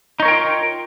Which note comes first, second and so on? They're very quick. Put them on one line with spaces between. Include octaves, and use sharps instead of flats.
D#4 C#5 A#4 G5 F4